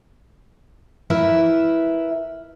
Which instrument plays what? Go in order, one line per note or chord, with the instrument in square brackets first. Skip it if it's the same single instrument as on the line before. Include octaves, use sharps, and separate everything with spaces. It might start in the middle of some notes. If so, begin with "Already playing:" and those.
[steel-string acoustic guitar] E4 A#4 B4 E5